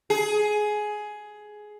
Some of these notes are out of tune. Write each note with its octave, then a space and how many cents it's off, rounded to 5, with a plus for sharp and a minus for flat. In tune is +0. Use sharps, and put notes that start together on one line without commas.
G#4 +15